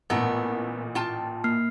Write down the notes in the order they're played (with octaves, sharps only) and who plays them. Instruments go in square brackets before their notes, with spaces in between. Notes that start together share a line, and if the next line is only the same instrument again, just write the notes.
[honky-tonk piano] A1 A#2 [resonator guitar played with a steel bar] A3 B3 A#4
[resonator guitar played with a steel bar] F4 G5 A5
[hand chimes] A#3 F6 C7